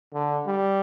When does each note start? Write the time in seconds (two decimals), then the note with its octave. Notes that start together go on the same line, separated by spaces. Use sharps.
0.13 D3
0.47 G3